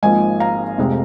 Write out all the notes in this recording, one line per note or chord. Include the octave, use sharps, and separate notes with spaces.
G#1 G#2 F3 A#3 D#5 G#5
F5 A#5
F1 F2 C3 G#3